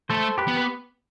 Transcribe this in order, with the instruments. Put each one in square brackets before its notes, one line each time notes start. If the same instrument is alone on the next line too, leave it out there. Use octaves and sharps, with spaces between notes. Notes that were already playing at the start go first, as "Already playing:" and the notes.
[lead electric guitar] A3 [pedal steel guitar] A4 C5
[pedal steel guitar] G4 B4
[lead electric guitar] B3
[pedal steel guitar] B4